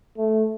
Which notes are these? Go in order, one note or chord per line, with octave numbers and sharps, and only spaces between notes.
A3